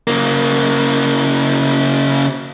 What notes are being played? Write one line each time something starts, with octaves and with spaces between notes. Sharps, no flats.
C#3 A#3